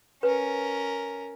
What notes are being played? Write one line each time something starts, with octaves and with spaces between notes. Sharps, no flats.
C#4 A#4 B4